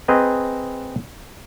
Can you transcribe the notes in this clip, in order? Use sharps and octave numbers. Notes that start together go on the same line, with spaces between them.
C4 G#4 B4 D#5 A#5